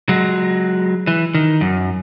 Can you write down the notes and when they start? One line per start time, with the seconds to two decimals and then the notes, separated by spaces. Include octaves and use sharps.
0.09 F#3 G#3
1.07 E3
1.35 D#3
1.61 F#2